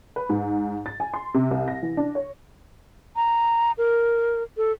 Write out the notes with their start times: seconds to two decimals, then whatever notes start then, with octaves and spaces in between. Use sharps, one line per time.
0.16 B4
0.29 G#2
0.86 A6
1.00 G#5
1.14 C6
1.34 C3
1.51 C2
1.68 A#6
1.83 E3
1.97 D4
2.15 C#5
3.16 A#5
3.78 A#4
4.57 A4